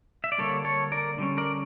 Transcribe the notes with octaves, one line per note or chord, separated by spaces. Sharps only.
E5
D5
D3 G3 A#3 A4 C#5
A4 C#5
A#4 D5
D3 G3 C#4
A#4 D5